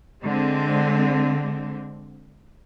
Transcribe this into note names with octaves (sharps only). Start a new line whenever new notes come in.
D3 G#3 C4